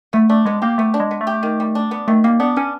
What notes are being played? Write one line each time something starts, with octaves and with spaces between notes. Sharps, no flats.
A3 B3
A3 D4
G#3 B3
A#3 G4
A3 B3
D4
G#3
B3
A3
G4
D#3
G3
D4
B3
D#3 A3
G3 A#3
B3 D4
B3 C#4